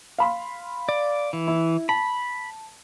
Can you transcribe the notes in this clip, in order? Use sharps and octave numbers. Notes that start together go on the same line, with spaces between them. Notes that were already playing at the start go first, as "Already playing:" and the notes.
F5 B5 C6
D5
E3
E4
A5 B5